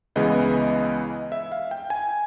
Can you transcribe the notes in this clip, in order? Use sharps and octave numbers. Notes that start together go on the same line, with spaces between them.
C#2 C#3 E3 G#3 B3 D#5
E5
F5
G5
G#5